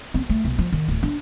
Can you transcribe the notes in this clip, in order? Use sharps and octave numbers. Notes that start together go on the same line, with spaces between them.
C4
A3
B1
F3
D#3
D1
D4